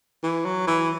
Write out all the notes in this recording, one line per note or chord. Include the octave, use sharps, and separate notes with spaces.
E3
F#3
E3